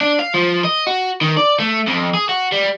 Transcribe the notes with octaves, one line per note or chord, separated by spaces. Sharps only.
D4
F5
F3
D#5
F#4
D#3
D5
A3
F2
G#4
F#4
G3